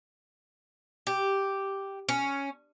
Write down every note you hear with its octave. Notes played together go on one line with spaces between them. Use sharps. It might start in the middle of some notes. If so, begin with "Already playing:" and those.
G4
C#4